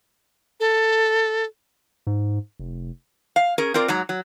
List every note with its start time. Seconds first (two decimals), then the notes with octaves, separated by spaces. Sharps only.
0.60 A4
2.07 G#2
2.59 F1
3.36 F5
3.58 C#4 G#4 A#4
3.74 C4 F4 A#4 D5
3.88 G#2 F#3 A#5
4.09 F#3